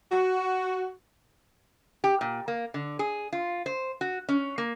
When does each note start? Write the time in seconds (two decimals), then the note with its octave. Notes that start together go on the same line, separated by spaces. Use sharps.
0.12 F#4
2.04 G4
2.21 A#2
2.48 A#3
2.74 D3
2.99 G#4
3.33 F4
3.66 C5
4.01 F#4
4.29 C#4
4.58 A#3